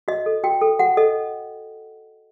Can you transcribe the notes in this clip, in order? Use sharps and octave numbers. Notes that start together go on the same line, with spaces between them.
F#4 D#5
A4
F#4 G5
A4
F#4 F#5
A4 D#5